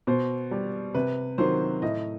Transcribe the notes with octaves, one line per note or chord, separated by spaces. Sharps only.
B2 C5
G3
C3 B4
D#3 F#3 C5
A2 D#5